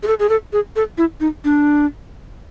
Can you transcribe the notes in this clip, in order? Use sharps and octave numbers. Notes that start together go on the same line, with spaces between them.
G#4
A4
G#4
A4
G#4
A4
E4
D#4
D4